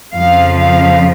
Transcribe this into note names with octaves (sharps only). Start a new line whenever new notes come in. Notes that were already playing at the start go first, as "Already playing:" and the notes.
F2 C#3 F3 F5
F5